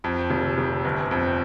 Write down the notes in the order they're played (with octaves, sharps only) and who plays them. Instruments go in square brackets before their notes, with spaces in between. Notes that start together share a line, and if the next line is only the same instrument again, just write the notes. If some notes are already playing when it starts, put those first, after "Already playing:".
[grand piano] F2
F1
F1
G1
F2